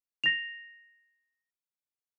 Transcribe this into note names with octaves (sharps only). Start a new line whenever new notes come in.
A#6 F7